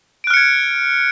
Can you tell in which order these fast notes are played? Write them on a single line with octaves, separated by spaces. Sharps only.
D7 F#6 F6 C#7 G#6